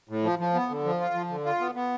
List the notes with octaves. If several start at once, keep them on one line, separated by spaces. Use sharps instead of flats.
A2
F3
F3
B3
D3
F3
F4
F3
D3
F4
B3
B3